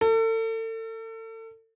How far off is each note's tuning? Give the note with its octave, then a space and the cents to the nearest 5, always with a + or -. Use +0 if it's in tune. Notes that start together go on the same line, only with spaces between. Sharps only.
A4 +35